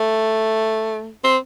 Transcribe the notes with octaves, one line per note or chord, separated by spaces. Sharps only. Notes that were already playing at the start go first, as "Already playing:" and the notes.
Already playing: A3
C4